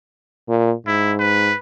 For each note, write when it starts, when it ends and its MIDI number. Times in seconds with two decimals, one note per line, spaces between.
0.49 0.73 46
0.86 1.52 44
0.86 1.13 64
1.19 1.57 71